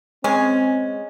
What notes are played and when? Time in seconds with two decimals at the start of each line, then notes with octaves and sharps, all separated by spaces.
0.24 G#3 C4 C#4